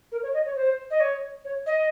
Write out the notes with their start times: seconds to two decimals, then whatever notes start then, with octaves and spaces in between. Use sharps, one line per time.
0.12 A#4
0.23 C#5
0.34 D#5
0.45 C#5
0.56 C5
0.91 D#5
1.00 C#5
1.45 C#5
1.66 D#5